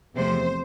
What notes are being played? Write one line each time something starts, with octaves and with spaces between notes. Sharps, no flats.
E2 C3 F3 A3 C5